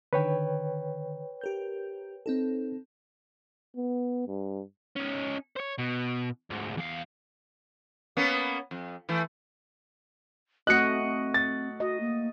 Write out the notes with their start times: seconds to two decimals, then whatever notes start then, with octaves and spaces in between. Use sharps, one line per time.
0.13 D3 D#3 B4 C#5 G5
1.41 G4 A#4 G6
2.26 C4 D#4 A4
3.77 B3
4.28 G2
4.96 C#4 D#4
5.56 C5 C#5
5.79 B2
6.50 D2 G#2
6.77 E2 F5
8.17 A#3 B3 C#4
8.71 F2
9.09 E3 A3
10.67 A3 C4 F#4 D#5 F#6 C#7
11.02 C4
11.34 A6
11.80 F#4 D#5
12.00 A#3